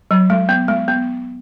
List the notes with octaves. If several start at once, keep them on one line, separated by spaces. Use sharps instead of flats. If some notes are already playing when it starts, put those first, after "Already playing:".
F#3
G#3
B3
G#3
B3